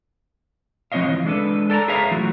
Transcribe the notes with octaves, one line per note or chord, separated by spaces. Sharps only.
F3 C4 C#4 C#5 D#5 F5
E3
G#3 D4 A4 B4
A4 D5 G#5 A#5
G#4 B4 C#5 E5 F5 A#5
E3 F#3 A3 F4 F#4